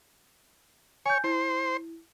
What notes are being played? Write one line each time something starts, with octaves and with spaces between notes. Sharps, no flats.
C#5 G#5 G6
E4 C5